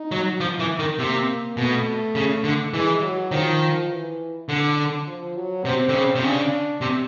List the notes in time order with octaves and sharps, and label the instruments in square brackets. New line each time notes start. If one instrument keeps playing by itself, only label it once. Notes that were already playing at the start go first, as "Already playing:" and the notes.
Already playing: [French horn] D#4
[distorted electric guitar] F#3
F3
E3
D#3
[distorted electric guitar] C3 [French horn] A#3
[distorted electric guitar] B2 [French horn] A3
[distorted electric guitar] C#3
D3
[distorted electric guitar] E3 [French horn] G#3
[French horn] F#3
[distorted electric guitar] D#3 [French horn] F3
[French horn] E3
[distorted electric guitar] D3
[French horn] F3
F#3
[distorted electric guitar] C3 [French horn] C4
[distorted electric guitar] D3
C#3
C3
[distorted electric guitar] C#3 [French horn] D4
[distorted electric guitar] C3